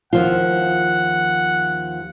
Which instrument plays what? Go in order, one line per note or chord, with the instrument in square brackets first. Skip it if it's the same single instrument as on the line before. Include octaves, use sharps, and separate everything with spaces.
[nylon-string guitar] D#2 F3 F4 [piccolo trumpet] F#5